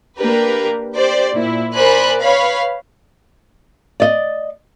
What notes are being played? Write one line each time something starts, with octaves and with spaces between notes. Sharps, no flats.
A#3 D4 G4 A#4 B4
G4 C5 D5
A#2 E4
A#4 C5 D5 G#5 B5 F#6
B4 C#5 F5 B5
D5 D#5